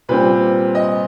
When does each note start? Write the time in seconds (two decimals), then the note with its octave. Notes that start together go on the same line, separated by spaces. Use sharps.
0.09 A#2 G3 C4 B4
0.75 D#5